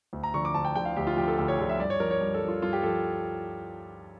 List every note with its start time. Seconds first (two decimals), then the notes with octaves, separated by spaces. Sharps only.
0.13 D2
0.23 A#5
0.34 D3 F3 C#6
0.45 D6
0.54 D2 A5
0.65 G5
0.76 D3 F3 G5
0.85 F5
0.96 D2 G4
1.07 F4
1.17 D3 F3 G4
1.28 A4
1.38 D2 G4
1.48 C#5
1.59 D3 F3 G4
1.69 E5
1.80 G2 D5
1.90 C#5
2.00 F3 A#4
2.11 C#5
2.21 G2
2.34 A4
2.42 F3
2.48 F4
2.62 G2 F4
2.73 G4
2.83 F3 A4